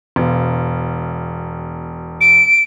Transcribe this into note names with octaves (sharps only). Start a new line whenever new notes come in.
E1
D7